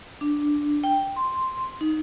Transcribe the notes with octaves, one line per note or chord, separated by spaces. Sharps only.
D4
G5
C6
D#4